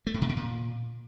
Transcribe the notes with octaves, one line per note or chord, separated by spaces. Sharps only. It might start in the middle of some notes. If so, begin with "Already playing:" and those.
A3
A2
C3
B2
A#2